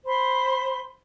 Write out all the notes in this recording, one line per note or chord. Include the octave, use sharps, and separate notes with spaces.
C5 B5 C6